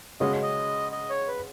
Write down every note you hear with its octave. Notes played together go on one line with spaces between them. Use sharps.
C#3 G#3 C#4 F#4 D#5
D#5
D#5
C#5
B4